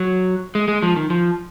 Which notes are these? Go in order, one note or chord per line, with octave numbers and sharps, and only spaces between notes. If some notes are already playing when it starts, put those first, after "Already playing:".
Already playing: F#3
G#3
G#3
F3
D#3
F3